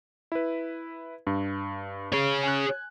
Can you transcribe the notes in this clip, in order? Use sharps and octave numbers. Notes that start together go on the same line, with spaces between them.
E4 B4
G2
G#4 C#5
G#5 F#6